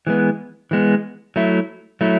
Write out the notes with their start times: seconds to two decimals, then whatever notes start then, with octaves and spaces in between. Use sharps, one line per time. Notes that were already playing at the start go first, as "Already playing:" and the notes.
0.07 E3 G#3 B3
0.71 E3 G#3 B3
1.36 F#3 A3 E4
2.01 F#3 A3 E4